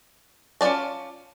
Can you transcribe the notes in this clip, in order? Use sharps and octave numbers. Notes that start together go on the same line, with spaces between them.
C#4 F4 G#4 D5 A5